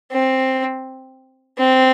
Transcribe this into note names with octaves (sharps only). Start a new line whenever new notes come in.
C4
C4